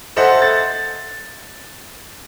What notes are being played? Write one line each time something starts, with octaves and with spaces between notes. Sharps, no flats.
A4 C5 D#5 E5 F#5
A6